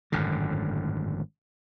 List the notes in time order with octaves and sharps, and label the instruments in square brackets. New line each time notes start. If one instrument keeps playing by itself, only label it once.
[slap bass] G#1 F#2 A2 D3